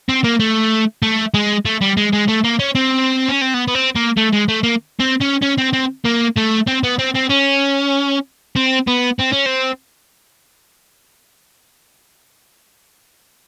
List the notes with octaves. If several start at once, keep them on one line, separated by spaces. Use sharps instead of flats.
C4
A#3
A3
A3
G#3
A3
G3
G#3
G#3
A3
A#3
C#4
C4
C#4
C4
B3
B3
C4
A#3
A3
G#3
A3
A#3
C4
C#4
C#4
C4
C4
A#3
A3
C4
B3
C4
C4
C#4
C4
B3
C4
C#4
C4